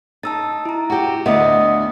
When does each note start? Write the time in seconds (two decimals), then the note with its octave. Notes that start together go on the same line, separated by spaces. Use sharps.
0.23 D#4 A5 E6 A6
0.65 E4 A#5
0.90 F#4 G4
1.26 D2 B3 D#5 E5 D#6